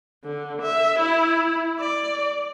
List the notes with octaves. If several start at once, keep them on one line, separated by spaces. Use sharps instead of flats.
D3
E5
E4
D5